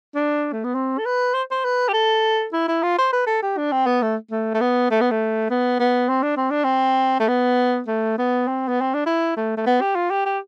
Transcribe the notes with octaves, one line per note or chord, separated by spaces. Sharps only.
D4
A3
B3
C4
A4
B4
C5
C5
B4
G4
A4
E4
E4
F4
C5
B4
A4
G4
D4
C4
B3
A3
A3
A3
B3
A3
B3
A3
B3
B3
C4
D4
C4
D4
C4
A3
B3
A3
B3
C4
B3
C4
D4
E4
A3
A3
B3
G4
F4
G4
G4